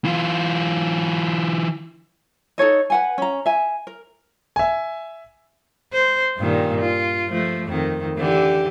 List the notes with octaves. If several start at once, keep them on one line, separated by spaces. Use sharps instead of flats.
E3 F4
D#4 A4 C#5 D#5
B4 F#5 G#5
C#4 A#5
E5 G#5
A#4
E5 G#5
C5
G2 A#2 D#3
F4
F3 A3
F2 D#3
D3 E3 G4